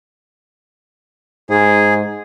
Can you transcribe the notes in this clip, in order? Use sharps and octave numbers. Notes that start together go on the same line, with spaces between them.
G#2 G#4